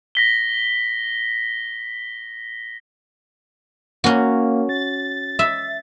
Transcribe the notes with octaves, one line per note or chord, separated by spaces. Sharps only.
A#6 B6 G7
A#3 C#4 F#4
A6
E5